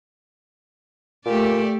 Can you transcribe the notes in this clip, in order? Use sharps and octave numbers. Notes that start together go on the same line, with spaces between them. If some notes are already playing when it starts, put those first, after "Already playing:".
A#2 A3 G4 D5